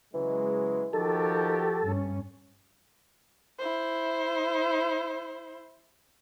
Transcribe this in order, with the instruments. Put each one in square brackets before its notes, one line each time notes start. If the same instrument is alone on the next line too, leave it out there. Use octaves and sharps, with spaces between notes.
[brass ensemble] C#3 F#3 G#3 [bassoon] E3
[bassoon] D#3 [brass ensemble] F3 F#4 G4 [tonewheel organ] A4
[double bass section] G2 C#4
[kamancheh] E4 C5